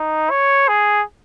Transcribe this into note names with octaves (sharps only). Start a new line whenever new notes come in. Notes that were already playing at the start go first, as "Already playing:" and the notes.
Already playing: D#4
C#5
G#4